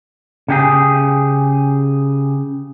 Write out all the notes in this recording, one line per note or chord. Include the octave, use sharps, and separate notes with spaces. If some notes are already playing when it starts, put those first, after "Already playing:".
C#3 G4 G#4